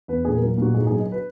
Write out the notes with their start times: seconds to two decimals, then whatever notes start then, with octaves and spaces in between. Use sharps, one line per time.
0.08 E2 B4
0.25 A#2 G#4
0.37 F#3 A#4
0.58 A#2 F#4
0.74 G#2 G#4
0.87 F#3 G#4
0.99 D#5
1.12 B4